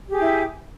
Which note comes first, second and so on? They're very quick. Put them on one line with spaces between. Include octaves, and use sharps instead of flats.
G4 G#4 G5 E4